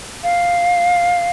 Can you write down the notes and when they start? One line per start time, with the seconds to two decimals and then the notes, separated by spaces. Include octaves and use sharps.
0.23 F5